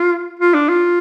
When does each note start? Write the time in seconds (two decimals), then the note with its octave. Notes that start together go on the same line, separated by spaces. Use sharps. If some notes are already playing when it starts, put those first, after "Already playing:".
Already playing: F4
0.39 F4
0.54 D4
0.69 F4